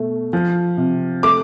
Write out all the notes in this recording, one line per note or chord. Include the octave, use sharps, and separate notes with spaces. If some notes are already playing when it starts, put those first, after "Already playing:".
Already playing: B2 A3
F3
C3
A3 D6